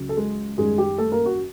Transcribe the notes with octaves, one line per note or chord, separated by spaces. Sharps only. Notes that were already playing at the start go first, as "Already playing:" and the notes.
Already playing: C#2 C#3 F#3
A4
G#3 G#4
F#2 D#3 G3 G#3 G#4
G4
A3 A4
A#3 A#4
F#4